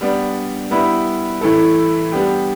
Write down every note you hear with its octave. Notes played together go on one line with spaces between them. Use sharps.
G3 B3 D4
G3 B3 E4 B4
A2 E3 A3 E4 A4
G3 B3 D4 G4